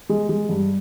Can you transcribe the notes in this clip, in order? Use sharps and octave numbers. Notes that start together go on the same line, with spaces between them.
G#3
G#3
G2